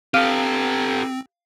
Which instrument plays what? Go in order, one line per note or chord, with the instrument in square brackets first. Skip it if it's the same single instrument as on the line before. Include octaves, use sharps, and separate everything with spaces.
[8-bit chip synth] C4 [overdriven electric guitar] G4 A4 [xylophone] F5 F6 D#7